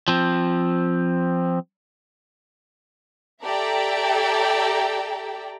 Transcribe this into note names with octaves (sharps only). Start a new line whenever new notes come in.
F3 C4
G4 A4 D5 E5 G5 A#5